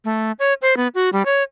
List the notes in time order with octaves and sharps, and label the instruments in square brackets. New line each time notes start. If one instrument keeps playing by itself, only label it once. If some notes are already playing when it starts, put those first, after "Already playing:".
[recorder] A3
C#5
C5
B3
F#4
G3
C#5